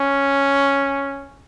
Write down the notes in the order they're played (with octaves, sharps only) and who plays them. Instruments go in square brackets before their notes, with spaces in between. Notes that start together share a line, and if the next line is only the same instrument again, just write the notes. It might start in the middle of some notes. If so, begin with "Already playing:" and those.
Already playing: [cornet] C#4